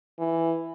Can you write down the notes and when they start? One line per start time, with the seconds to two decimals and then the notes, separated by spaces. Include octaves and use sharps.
0.19 E3